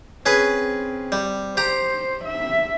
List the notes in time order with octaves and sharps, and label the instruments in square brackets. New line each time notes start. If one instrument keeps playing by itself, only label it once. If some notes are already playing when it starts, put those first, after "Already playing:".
[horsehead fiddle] C4 [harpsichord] C#4 G#4 B4
[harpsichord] G3
[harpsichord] G4 A#5 [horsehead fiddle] C5
[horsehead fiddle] E5